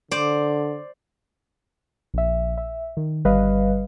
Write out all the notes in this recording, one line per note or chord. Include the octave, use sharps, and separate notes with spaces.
D3 C5 D5
A#1 E5
E5
D#3
G1 G3 B4 D#5 F5